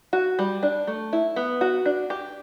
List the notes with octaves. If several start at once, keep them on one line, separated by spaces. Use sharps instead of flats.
F#4
G3
D4
A3
E4
B3
F#4
D4
G4